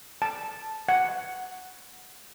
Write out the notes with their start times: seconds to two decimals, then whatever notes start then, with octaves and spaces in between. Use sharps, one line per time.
0.22 A5
0.89 F#5